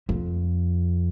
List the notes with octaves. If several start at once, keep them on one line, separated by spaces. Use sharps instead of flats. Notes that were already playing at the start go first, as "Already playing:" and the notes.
F2